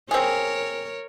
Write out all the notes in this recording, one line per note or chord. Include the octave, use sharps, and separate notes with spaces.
C4 G#4 A#4 C#5